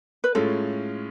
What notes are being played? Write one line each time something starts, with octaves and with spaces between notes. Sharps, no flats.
B4
A2 G#3 C#4 F4 A4